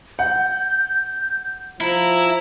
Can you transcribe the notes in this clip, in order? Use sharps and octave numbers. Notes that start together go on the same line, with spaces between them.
F#5 G6
F3 E4 A#5